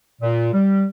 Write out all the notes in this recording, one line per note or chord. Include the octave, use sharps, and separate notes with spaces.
A#2
G3